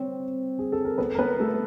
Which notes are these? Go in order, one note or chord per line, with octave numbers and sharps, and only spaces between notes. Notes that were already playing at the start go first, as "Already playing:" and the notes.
Already playing: C4 C5 C#5
G#4
A4
A#4
B3 B4
A#4
B3 B4
A3 A4